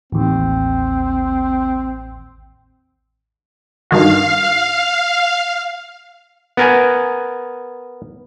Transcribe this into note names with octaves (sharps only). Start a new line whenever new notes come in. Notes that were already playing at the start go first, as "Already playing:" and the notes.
A1 D#2 C4
G2 D#3 F#4 F5
B3 A#4 G#5